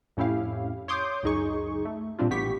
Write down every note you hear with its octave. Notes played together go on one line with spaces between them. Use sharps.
F2 A2 C#4 E4 G4 F5
C#5 C6 D6 D#6 G6
C#2 F#2 D#4 G#4 C#6
A3
A#2 G3 C4 D4 F4
A1 B3 G4 C#6 B6